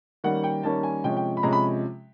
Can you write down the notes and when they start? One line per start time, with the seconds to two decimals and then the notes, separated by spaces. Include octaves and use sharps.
0.24 D#3 G3 A#3 C#4 F#5
0.44 G5
0.63 D#3 G3 A#3 C#4 A5
0.83 G#5
1.04 C3 F3 G#3 C#4 G5
1.17 G5
1.37 B5
1.43 C3 F3 G#3 C#4 A#5
1.53 B5